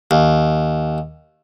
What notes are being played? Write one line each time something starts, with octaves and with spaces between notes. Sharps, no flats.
D#2